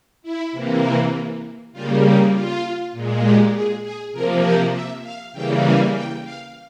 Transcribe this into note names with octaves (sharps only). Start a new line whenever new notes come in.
E4
C3 E3 A#3
C#3 G3 A#3 F4
G4
F4
A#2 G#3
G4
G#4
G#4
C3 F3 A#3 A#4
C5
E5
F5
C#3 E3 G3 A#3 G5
G#5
G5
F5